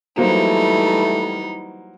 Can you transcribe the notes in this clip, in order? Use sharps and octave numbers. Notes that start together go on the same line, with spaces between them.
E3 F#3 G3 A3 A#3 D#4 C5